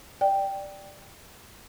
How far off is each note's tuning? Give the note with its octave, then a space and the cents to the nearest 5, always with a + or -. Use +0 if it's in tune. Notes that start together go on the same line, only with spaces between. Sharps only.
D5 +0 G5 +0